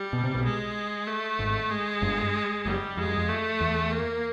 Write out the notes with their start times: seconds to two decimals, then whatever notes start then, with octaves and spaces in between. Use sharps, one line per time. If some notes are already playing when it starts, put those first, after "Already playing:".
Already playing: G3
0.13 B2
0.24 C3
0.34 B1 B2
0.44 G#3
1.07 A3
1.39 G#1 G#2
1.71 G#3
2.02 G1 G2
2.65 F#1 F#2 G3
2.97 F2 G#3
3.08 F#2
3.17 F2
3.29 A3
3.61 E2
3.92 A#3